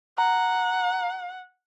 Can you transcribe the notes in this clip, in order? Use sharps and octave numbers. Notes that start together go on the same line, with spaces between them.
F#5 A#5